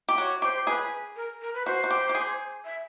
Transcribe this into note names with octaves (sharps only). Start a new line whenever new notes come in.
G4
F#4 C#5
G4 C5
G#4 B4
A#4
A#4
B4
F#4 C5
F#4
G4
G4
G#4
E5